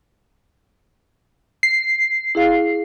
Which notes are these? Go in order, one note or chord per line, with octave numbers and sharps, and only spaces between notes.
C7
E4 G#4 F5